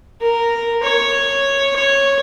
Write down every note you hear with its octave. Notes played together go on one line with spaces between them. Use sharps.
A#4
C#5
C#5